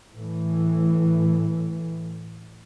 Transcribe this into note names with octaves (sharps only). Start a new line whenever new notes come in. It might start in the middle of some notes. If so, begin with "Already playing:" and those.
A2 E3